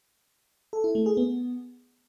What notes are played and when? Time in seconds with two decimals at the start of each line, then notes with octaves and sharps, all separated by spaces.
0.73 A4
0.84 E4
0.95 A3
1.06 G#4
1.17 B3